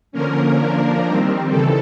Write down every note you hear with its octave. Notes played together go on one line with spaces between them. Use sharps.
D3 F3 A#3 C#4 A#4
F3 A#3 D4
D#3 G3 C4
C#3 E3 A4